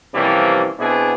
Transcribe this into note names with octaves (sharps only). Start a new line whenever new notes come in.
C3 E3 F3 G3 A#3 C#4
B2 B3 C4 D4 E4 G#4